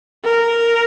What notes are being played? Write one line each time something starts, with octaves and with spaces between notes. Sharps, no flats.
A#4